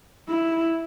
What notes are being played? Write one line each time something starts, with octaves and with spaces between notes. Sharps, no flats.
E4